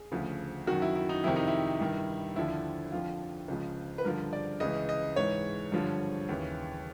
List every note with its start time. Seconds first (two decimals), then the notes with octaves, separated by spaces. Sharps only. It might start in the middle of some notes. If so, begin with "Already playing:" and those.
Already playing: G#4
0.12 D2 C#3 F3
0.67 F#2 D#3 F#4
0.82 E4
0.96 E4
1.09 D#4
1.24 F2 C3 D#3 E4
1.36 D#4
1.47 E4
1.80 G2 D#3
2.36 D#2 D3 F3 E4
2.92 F2 D3 F3 F4
3.48 C#2 C#3 F3
3.98 B4
4.05 G2 D3 F3 A#4
4.33 D5
4.60 C#2 C#3 E3 D#5
4.89 D#5
5.16 G#2 E3 C#5
5.72 G2 D3 F3
6.29 D#2 C#3 E3